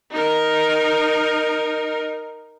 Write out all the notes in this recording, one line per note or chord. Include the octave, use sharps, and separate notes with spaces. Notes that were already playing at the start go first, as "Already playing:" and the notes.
D#4 A#4